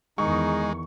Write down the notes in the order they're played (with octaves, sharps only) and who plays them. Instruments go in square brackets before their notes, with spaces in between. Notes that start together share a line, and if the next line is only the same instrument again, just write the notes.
[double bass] E2 D#3 [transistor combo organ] G#3 [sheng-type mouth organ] D#4 [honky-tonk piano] C#6